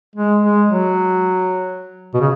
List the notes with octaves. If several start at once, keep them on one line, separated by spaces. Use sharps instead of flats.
G#3
G#3
F#3
B2
C#3